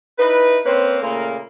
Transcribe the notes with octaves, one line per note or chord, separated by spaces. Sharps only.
D#4 E4 B4
A#3 C4 C#4 B4 C5
A#2 C#3 A3 A#3